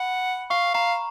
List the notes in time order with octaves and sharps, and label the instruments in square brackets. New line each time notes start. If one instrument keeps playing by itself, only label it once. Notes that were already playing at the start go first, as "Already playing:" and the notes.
Already playing: [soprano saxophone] F#5 [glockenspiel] B5
[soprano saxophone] F5 [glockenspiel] C#6
[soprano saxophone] F5 [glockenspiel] A#5